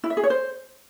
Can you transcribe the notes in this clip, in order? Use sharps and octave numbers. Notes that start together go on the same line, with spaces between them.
E4
E5
G#4
C#5
C5